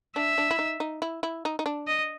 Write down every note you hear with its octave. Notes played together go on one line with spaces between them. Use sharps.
D4 E5
D4
E4
D#4
D#4
E4
E4
D#4
D#4
D4
D#5